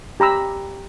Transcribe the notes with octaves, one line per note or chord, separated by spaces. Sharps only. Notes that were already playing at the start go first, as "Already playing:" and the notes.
G4 A#5 B5 E6